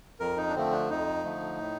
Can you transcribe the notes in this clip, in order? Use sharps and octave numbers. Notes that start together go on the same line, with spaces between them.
F2 A#4
D#4
D4
D3 F3 A3 C4
D4
F2 D#4
D3 F3 A3
A2